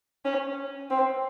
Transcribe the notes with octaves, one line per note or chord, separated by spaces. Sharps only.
C#4
C4